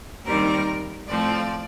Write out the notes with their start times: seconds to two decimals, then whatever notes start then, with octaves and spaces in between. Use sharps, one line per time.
0.24 D#2 D#3 G3 C4 A#4
1.07 A2 F3 C4 D5